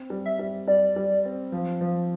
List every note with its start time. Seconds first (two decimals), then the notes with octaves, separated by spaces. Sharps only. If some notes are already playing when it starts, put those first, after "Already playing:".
Already playing: C4
0.10 G3
0.26 E5
0.39 G3
0.68 G3 D5
0.96 G3
1.25 C4
1.52 F3
1.81 F3